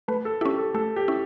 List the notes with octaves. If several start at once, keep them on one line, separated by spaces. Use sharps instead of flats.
A3 B4
A4
C#4 E4 G4
A4
A3 A4
G4
C#4 E4